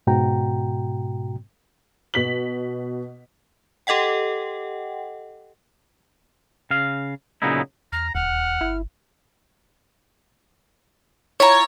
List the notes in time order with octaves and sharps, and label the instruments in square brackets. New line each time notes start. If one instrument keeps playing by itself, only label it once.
[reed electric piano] G#2 B2 F#4 G5 A#5
[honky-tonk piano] B2 B6 F#7
[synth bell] G4 A4 D#5 F#5 G5
[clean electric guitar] C#3 F5
A#2 C#3 F#3 B3 D#4 E4
[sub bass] E2 [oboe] A#5 [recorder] F6
[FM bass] D1 [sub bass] D#2 [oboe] F#5 [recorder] F6
[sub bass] G1 [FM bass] E4
[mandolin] E4 F4 A#5 [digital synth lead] C#5